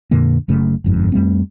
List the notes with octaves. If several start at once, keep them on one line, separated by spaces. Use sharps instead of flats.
F2 A#2 D3 A#3
F#1 F#2 C#3 A3
G1 F2 G#2
F2 G3 A3 C4